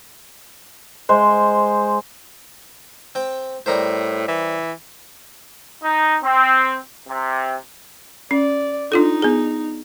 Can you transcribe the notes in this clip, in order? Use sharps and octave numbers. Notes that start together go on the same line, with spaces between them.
G#3 C5
C4 G5
A2 G3 A#4 C5
E3
D#4
C4
C3
C#4 D5
D4 D#4 F4 A4
B3 G#4